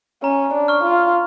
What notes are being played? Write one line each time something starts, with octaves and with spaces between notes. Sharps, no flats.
C#4 A#5
D4
C#6 F6
F4